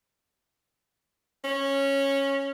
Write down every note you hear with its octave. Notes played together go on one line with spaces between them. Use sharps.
C#4